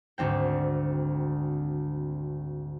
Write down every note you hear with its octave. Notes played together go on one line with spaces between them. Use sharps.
G#1 D2 C4 G5